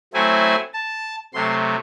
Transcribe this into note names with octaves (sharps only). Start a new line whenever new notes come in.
F#3 A3 C4 E4 G#5
A5
C3 F#3 A3 C6